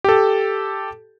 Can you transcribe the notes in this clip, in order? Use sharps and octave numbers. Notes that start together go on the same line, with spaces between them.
G4 A4